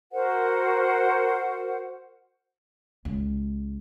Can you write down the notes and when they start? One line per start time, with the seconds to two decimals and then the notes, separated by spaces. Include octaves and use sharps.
0.12 F#4 A#4 C5 F#5
3.05 C#2